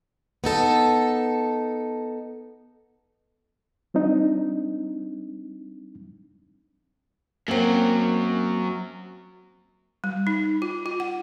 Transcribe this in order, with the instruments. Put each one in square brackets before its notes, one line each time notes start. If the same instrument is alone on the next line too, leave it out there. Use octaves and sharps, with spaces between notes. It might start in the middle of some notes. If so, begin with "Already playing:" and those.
[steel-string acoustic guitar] B3 D#4 A4
[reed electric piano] G3 C4 D4 D#4
[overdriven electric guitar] F#2 F#3 [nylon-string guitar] A#3 C4
[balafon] G3
D#4
F4
F4
F#5